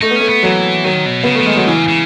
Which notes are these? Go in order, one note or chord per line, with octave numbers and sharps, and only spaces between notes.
A3 D#4
B3
A3 C#4
B3
E3 F#3
D#3 F#3
B2
C#3 B3
A3
E3
D#3 G#3
F#3
C#3 E3
C#3